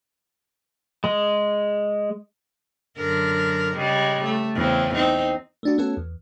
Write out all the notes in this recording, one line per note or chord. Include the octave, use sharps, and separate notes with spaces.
G#3
F#2 D3 A#4
C#3 G3 G#3
A3
E2 C#3 C4
C4 D#4
A3 D4 F#4
A3 B3 C#4 F#4 A4
E2